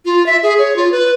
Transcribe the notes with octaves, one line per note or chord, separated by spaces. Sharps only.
F4
E5
G#4
C#5
F4
B4